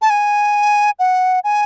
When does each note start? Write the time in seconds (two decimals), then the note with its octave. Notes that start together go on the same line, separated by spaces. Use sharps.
0.02 A5
0.10 G#5
0.99 F#5
1.44 G#5